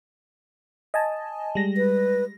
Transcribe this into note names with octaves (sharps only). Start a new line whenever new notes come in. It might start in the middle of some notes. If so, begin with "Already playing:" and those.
D#5 G#5 A5
G3 G#3 A#6
B4